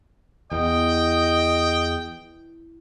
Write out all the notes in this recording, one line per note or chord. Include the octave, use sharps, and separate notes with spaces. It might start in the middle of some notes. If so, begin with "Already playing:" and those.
E2 D#5 G5